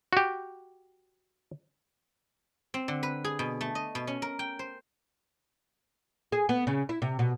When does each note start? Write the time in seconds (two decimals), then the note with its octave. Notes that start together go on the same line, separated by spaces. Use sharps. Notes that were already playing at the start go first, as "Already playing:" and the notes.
0.13 F#4 G4
2.74 C4
2.88 D3
3.03 B4
3.24 G#4
3.39 B2
3.61 A3
3.75 D#5
3.95 B2
4.07 C#4
4.22 A#4
4.39 G5
4.59 C5
6.32 G#4
6.49 B3
6.67 C#3
6.89 E4
7.02 C3
7.19 B2